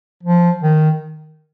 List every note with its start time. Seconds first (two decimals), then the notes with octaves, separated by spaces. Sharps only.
0.23 F3
0.63 D#3